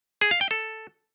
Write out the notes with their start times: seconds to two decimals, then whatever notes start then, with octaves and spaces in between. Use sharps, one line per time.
0.21 G#4
0.31 F5
0.41 G5
0.51 A4